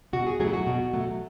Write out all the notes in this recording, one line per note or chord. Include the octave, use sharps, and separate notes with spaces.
B2 F#4
G#4
F#3 A3 G#4
E4
F#4
B2
F#3 A3